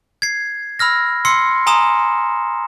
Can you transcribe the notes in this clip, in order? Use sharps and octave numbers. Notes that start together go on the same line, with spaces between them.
G#6 C7
B5 E6 F6 A#6
C6 E6 C7 C#7
G#5 A#5 C6 D#6 E7